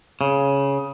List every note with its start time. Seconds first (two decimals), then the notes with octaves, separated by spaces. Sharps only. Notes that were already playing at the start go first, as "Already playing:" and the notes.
0.21 C#3